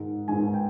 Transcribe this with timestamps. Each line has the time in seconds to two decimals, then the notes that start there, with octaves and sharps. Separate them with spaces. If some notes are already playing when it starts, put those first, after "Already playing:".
Already playing: G#2 D#3 G#3
0.28 G#2 D#3 G#3 G#5
0.54 G5